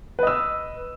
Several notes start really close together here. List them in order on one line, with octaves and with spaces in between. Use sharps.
B4 D#5 E6